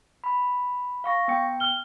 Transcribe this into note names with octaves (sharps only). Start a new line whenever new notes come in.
B5
F5 C#6 A#6
B3 G5 C#7
F6 G7